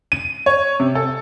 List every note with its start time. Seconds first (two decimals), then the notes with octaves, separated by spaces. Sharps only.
0.12 D#7
0.46 C#5
0.80 C3
0.95 A4